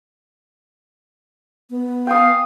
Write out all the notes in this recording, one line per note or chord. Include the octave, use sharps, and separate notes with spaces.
B3
F5 G5 G#5 D#6